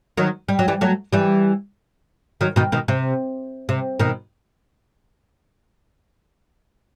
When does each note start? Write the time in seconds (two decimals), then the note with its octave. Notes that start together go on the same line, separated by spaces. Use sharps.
0.17 D#3 F#3
0.49 G3
0.59 F#3
0.68 E3 G3
0.81 F#3 A3
1.13 E3 G3
2.41 D#3 F#3
2.56 B2 D#3
2.72 B2 D#3
2.88 C3
3.69 C3
4.00 B2 D#3